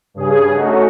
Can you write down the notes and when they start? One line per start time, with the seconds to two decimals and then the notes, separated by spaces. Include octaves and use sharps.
0.14 G2 C#3 G#4
0.54 A3 C#4 D#4 F#4